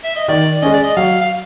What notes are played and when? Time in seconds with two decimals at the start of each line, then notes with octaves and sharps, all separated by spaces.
0.04 E5
0.16 D#5
0.28 D#3 D5
0.62 G#3 C#4 D#5
0.73 D5
0.83 D#5
0.96 F#3 F5
1.21 F5